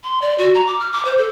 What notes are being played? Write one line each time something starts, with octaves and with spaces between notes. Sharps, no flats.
C6
D5
F#4
A#5
D6
F6
D6
C5
A4